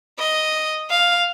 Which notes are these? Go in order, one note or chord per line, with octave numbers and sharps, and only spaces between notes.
D#5
F5